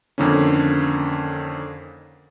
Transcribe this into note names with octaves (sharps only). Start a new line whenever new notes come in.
F2 D3 D#3 A#3 C#4